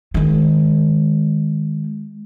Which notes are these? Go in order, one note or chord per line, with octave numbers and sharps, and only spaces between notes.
D#3 G#3